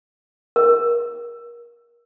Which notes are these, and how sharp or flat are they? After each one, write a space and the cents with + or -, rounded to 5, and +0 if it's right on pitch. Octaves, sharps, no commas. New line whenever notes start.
A#4 +25